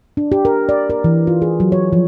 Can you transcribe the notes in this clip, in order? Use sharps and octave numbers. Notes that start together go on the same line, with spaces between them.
D4
G4
A#4
D5
A#4
E3
F4
G#4
F#3
C#5
F3